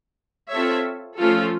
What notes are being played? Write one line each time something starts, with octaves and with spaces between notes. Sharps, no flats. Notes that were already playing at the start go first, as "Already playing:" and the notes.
C4 F4 A4 C#5 E5
F3 A3 C#4 F4 A4